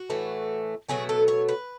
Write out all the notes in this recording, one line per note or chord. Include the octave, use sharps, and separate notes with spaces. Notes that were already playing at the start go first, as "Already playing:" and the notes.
Already playing: F#4
A2 E3 A3
B2 F#3 A3 G#4
A4
C#5
B4